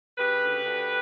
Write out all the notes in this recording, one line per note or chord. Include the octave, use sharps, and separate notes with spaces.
C#3 G4 B4
D2
D2